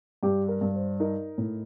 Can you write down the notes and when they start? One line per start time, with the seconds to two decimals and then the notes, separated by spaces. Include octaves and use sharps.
0.23 G2 G4
0.48 A#4
0.61 G2
0.75 C5
1.00 D#4 A#4
1.38 A2